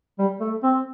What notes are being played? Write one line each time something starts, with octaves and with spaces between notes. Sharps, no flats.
G3
A3
C4